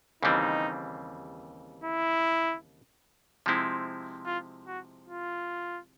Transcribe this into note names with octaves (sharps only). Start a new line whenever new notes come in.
D#2 C#3 E3 G3 C4 D#4
E4
C3 F3 G#3 C4 E4
F4
F#4
F4